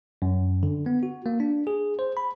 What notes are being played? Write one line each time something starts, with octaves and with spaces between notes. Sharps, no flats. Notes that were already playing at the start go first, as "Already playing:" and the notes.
F#2
D3
B3
F#4
A#3
D4
G#4
C5
B5